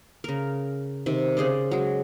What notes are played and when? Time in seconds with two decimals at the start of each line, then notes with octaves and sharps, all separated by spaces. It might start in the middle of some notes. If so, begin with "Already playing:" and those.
0.24 C#3 A#4
1.06 C3 D#3
1.37 C#3 G#4 C5 D5
1.71 F#3 G#3